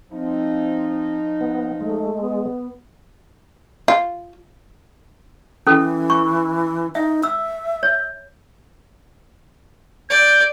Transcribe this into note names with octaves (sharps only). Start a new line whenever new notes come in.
F3 C4 D#4
B3
G#3 A3
B3
F4
E3 C#4 A4
C#6
D#4 E5
E5 E6
C#5
D5 G6